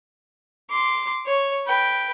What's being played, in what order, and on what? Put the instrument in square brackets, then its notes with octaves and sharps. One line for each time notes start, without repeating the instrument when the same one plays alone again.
[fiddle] C6 D6
C#5
B4 G5